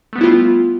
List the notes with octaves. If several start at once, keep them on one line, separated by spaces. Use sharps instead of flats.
G3 A3 B3 E4 F4